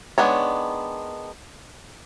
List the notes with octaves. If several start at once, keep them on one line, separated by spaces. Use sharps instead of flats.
D#3 G#3 B3 D4 C#5